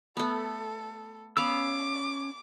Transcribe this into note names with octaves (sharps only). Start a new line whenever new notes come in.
A3 B3 A4
B3 C#4 B4 F5 D6 E6